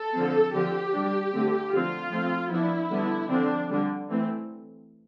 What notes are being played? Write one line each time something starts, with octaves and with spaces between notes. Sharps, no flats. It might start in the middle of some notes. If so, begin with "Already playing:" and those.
Already playing: A4
D3 F3 C4
D3 F3 C4 G4
G3 D4
D3 A3 C4
D3 F3 C4 F4
F3 A3 C4
F3 B3 D4 E4
D3 G3 B3 D4
D3 F3 C4 D4
D3 G3 D4
E3 A3 C4